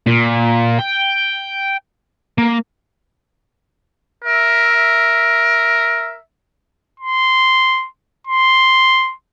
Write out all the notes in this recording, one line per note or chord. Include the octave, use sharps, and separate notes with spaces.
A#2
G5
A#3
A#4 E5
C6
C6